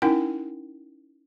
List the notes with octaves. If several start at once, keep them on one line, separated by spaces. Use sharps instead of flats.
C#4 D#4 E4 A#4 F#5 G5